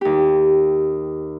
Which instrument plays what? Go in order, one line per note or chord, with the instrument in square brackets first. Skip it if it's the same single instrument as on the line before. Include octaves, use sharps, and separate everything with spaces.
[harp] D#2 G4